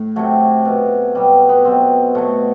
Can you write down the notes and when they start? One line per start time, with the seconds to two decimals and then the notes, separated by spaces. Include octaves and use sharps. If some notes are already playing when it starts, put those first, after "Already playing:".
Already playing: A2
0.16 C3 F#3 A3
0.65 B2 F#3
1.15 B2 F#3 G3
1.49 B3
1.65 B2 F#3 C4
2.15 B2 F#3 A3